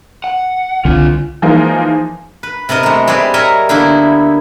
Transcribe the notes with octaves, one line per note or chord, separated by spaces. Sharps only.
F#5
C2 D3 C4 F4 G#5
E3 F3 G#3 A#3 D#4
B4
C3 B3 A#4 D#5
G#3 A3
G3 C4 G#4 B4 D5
A#4 C#5 D#5 E5 A#5
D3 A#3 B3 E4